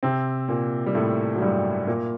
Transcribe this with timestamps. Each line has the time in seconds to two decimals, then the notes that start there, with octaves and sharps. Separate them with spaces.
0.03 C3 C4
0.48 A#2 A#3
0.86 G3
0.95 A2 A3
1.35 F#3
1.42 G2 G3
1.87 A#2 A#3